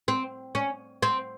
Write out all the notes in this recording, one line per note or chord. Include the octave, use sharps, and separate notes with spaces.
C4
C#4
C4